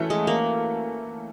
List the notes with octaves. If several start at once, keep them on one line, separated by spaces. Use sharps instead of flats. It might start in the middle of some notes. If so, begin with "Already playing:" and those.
Already playing: E3 A3 C#4 F#4
G#3
A#3